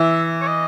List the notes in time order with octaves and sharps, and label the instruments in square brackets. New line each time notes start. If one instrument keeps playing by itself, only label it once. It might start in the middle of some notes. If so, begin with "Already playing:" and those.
Already playing: [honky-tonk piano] E3 [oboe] E5
[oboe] C#5
D#5